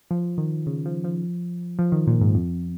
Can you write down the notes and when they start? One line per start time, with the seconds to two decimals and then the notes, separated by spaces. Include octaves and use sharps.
0.11 F3
0.38 D#3
0.66 C#3
0.86 F3
1.04 F3
1.79 F3
1.92 D#3
2.07 A#2
2.21 G#2
2.35 F2